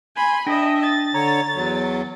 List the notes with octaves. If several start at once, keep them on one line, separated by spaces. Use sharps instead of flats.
G#5 B5 C6
D4 D#5 E5 G5 A#6
A6
D3 C#5 A#5
E2 F#3